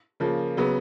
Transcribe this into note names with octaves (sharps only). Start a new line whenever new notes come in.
C#3 F3 A#3
C#3 F#3 B3